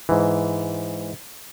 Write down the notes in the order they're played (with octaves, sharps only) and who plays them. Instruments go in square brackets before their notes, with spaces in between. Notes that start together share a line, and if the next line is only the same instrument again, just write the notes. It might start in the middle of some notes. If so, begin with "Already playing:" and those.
[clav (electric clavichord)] G#2 E3